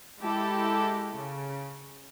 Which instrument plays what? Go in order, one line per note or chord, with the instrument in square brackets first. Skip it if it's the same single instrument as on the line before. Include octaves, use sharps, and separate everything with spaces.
[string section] G#3 E4 G4 A4
C#3